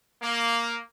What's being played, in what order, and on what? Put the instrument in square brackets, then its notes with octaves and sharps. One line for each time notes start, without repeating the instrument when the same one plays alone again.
[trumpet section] A#3